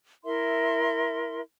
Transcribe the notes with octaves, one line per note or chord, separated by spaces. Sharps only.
E4 A#4 E5 C6